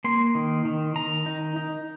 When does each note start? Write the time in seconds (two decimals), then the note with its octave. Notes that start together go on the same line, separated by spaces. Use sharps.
0.04 A#3 C6
0.35 D#3
0.65 D#3
0.95 D#3 A#5
1.26 D#4
1.56 D#4